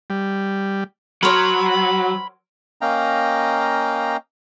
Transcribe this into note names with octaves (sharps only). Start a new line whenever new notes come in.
G3
F#3 A#4 C5 C#5 B5
A#3 C#4 D#5 F5 G5 A#5